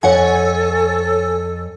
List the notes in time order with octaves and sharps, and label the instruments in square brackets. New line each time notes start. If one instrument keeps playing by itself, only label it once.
[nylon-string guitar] F2 F#5 [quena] A4 [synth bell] C#5 G#5